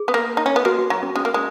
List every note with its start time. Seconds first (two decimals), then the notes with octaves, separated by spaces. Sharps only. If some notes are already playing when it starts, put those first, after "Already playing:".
Already playing: G#4
0.08 B3
0.14 A#3
0.37 D#4
0.46 C#4
0.56 B3
0.65 A#3 F#4
0.78 F#4
0.90 F#3
1.03 C#4
1.16 G#3 C#4
1.25 A#3
1.34 G#3